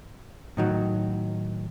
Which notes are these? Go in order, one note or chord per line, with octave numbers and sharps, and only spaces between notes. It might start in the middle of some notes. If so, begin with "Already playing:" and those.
A2 D#3 F#3